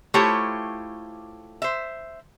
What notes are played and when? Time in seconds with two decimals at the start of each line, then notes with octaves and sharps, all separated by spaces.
0.14 A3 E4 F4 G4 C5 C#5
1.62 C5 E5